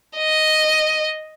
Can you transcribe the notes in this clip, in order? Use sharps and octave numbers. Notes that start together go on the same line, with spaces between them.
D#5